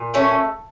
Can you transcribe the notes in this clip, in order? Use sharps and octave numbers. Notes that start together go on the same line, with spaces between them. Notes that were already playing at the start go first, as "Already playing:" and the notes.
Already playing: A#2
A3 C#4